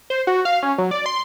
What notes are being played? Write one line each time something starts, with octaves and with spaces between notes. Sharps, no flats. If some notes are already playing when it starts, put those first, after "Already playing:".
C5
F#4
F5
C#4
F#3
D5
C6